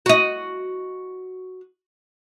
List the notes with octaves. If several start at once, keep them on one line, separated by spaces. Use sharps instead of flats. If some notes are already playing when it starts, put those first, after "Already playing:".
F#4 D#5